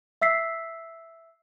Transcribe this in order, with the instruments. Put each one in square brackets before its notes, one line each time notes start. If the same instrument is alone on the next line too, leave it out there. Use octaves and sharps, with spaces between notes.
[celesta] E5 E6 B6 C7